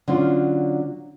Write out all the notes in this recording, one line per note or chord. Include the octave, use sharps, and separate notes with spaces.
D3 F#3 C#4 F4